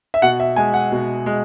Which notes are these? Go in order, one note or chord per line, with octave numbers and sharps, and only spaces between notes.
E5
B2 F#5
E5
G#3 G#5
F#5
B2
G#3